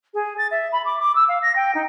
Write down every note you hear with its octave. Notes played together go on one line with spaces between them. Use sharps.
G#4
A6
E5
B5
D6
D6
E6
F5
A#6
G5
D#4